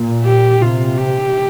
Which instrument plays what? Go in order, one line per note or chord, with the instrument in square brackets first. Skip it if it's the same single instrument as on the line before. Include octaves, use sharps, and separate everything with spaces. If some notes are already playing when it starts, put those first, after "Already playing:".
Already playing: [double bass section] A#2
[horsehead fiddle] G4
[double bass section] C3 [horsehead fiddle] F4
[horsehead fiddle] G4